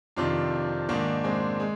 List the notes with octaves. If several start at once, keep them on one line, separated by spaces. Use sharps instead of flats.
F2 C3 D#3 D4 F4
G#2 D#3 A#3 D4
G#3 C4
G#3